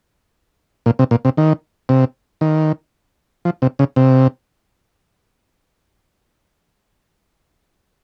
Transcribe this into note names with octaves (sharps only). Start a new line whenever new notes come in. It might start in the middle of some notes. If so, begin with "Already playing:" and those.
A#2
C3
A#2
C3
D#3
C3
D#3
F3
C3
C#3
C3